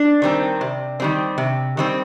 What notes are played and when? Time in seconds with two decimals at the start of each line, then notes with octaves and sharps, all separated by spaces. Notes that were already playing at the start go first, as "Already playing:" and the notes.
Already playing: D4
0.22 D#3 G3 C4
0.61 C3
1.00 D#3 G3 C4
1.38 C3
1.77 D#3 G3 C4